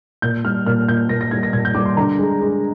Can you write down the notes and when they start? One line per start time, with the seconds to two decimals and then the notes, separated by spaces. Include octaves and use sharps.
0.22 A#2 G6
0.45 G3 F6
0.66 A#2 F6
0.88 A#2 G6
1.09 A#2 A#6
1.21 A#6
1.31 G3 G#6
1.43 A#6
1.53 A#2 G#6
1.65 G6
1.75 G3 D6
1.85 C6
1.97 D3 A#5
2.18 G#3
2.41 G#3